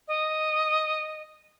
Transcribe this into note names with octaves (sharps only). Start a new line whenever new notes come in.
D#5